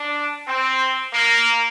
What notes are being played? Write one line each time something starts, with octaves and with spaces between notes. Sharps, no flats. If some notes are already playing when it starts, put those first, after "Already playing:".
Already playing: D4
C4
A#3